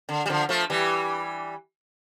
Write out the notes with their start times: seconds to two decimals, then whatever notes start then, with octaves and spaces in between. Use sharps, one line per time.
0.09 D3
0.26 G3
0.29 D3 F3
0.49 F3 A3
0.70 E3 G3